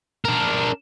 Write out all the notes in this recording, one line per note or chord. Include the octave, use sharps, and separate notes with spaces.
D4 A#4